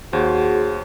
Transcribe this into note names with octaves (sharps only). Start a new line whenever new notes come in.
D#2 F#4 G#4 C5 C#5